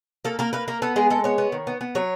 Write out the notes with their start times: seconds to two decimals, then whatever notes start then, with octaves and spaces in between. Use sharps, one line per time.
0.25 A#3 A4
0.39 A#3 A#4
0.53 A#3 B4
0.68 A#3 A#4
0.82 B3 A4
0.96 G#3 G#4
1.10 G#3 A4
1.24 B3 C#5
1.38 B3
1.52 D#3
1.67 B3
1.81 B3
1.95 F#3 C#5